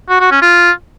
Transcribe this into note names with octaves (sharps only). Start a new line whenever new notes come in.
F#4
F#4
C#4
F4